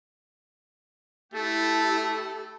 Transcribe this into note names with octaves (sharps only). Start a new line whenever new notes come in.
A3 E4 G4 A4